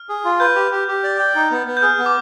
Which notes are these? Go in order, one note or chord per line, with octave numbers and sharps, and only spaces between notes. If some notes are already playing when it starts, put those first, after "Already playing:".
Already playing: F6
G#4
F4
B4 G6
G4
G4
G4
D5
G5
D#4
B3
B3
G6
G#4 F6
B3
D6